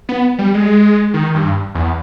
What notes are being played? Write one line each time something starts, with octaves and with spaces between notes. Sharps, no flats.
B3
G3
G#3
D#3
G2
E2